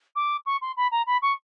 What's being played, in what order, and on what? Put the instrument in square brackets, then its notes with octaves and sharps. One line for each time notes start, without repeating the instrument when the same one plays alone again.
[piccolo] D6
C#6
C6
B5
A#5
B5
C#6